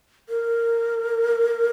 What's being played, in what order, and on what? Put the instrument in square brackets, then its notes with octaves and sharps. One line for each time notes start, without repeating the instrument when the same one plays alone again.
[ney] A#4